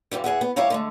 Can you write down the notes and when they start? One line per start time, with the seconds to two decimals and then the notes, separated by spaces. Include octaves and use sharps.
0.11 F#2 C#3 E3 G3
0.24 E2 G#4 E5 F#5
0.41 B3
0.56 D2 G3 E4 C#5 F5 A#5
0.70 D3 G#3 A3